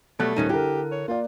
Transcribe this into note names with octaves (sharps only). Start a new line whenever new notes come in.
B2 F#3 G3 A3 F#6
D#1 D#3 C#4 D#4 D#7
D3 E4 G4 A4 A#4
C#5
A#3 F4 D5